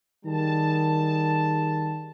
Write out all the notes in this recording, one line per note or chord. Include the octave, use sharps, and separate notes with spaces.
D#3 G3 G#4 A5